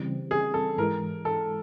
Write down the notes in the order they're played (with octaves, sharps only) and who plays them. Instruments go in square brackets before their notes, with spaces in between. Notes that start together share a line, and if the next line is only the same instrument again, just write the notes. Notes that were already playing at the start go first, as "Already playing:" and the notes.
Already playing: [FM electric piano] C#3 E3 G3 C4
[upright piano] G#4
A4
[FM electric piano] G#2 E3 G#3 [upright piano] A#4
[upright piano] A4